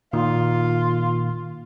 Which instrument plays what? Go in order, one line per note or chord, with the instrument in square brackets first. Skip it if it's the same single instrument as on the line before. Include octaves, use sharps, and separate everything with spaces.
[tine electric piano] A#2 D#3 [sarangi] F4